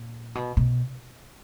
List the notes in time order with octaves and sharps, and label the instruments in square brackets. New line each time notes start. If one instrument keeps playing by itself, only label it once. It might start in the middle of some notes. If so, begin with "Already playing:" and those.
Already playing: [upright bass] A#2
B2
B2